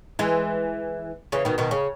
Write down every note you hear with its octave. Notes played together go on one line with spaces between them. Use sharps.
E3 G#3
C#3 E3
B2 D#3
B2 D#3
C#3